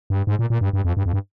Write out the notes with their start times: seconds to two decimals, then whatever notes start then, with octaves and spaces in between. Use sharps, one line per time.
0.10 G2
0.27 G#2
0.39 A#2
0.50 A#2
0.61 G2
0.73 G2
0.85 F2
0.97 G2
1.06 F2
1.13 G2